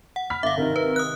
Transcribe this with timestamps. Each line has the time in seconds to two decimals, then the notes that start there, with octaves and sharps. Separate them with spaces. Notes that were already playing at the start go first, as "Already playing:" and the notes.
0.16 F#5
0.30 B5 F6 B6
0.43 G1 E5 F5 D6
0.58 G#1 C3 D#3 A#4
0.76 B4
0.96 D#6 F#6